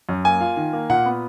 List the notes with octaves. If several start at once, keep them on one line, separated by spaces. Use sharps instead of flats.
F#2
A#3 G#5
F4
D#3
A#3
A#2 F#5
B3